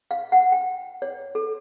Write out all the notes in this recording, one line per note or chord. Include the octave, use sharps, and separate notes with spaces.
F5
F#5
G5
C#5
A4